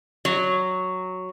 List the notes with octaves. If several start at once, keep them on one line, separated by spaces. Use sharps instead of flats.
F#3